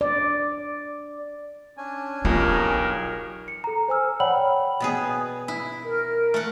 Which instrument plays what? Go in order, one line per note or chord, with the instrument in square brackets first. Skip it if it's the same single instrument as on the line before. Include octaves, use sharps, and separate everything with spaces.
[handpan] D5
[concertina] C#4 D4 G#5
[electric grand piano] B1 [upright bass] F4 [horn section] G4 G#4 A#4
[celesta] C#7
A4 A#5
C5 G#5 E6 F6
C#5 D5 F#5 G5 B5 F#7
[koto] B2 B3 G#4
E4
[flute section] A#4
[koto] A3 F#5